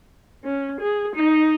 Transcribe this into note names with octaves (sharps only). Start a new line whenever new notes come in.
C#4
G#4
D#4